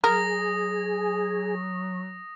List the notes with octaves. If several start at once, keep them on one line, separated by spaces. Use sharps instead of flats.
F#3 G#4 A#4 D#6 A#6